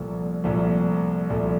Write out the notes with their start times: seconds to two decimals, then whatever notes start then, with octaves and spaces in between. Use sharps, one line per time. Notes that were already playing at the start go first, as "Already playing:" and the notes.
Already playing: C2 A#2 F3 A3
0.44 C2 A#2 F3 A3
1.30 C2 A#2 F3 A3